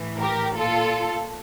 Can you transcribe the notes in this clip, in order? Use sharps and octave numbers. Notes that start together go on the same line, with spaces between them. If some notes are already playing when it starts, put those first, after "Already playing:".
Already playing: A2 E3
G4 A#4
A#2 F4 A4